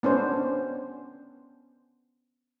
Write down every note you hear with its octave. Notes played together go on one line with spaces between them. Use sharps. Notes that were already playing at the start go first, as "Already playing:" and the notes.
B3 C#4 D4 C5